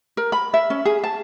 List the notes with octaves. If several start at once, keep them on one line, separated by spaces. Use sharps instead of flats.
A#4
B5
E5
C#4
G#4
A5